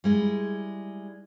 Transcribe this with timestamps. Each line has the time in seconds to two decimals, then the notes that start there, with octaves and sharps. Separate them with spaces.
0.04 G3 G#3 E4